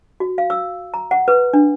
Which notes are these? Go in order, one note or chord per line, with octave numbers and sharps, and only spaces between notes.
F#4
F5
E6
A#5
F#5
B4
D4